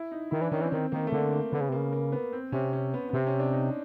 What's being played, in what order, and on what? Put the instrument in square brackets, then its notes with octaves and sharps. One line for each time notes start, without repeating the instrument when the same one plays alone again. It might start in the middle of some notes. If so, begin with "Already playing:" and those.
Already playing: [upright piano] E4
D#4
[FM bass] D#3 [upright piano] E4
[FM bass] E3 [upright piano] D4
[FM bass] D#3 [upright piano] C#4
[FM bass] E3 [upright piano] C4
[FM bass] D#3 [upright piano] C4
[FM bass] D#3 [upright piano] A#3
[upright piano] A3
[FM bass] D3 [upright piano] A#3
[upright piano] A#3
[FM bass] D3 [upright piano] B3
[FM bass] C#3
C3
[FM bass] C#3 [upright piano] A#3
[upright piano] A#3
B3
C4
[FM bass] C3 [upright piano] C#4
[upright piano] C#4
B3
B3
[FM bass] C3 [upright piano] C4
[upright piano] C#4
D4
D#4